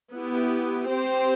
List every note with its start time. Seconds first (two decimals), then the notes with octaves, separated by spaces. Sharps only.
0.12 B3 E4 G4
0.88 C4 G4 C5